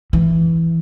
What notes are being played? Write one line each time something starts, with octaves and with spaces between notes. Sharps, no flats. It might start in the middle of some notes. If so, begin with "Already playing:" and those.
E3